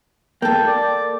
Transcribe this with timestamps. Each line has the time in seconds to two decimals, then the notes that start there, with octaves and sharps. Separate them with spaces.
0.42 A#3 A4 G5
0.68 D5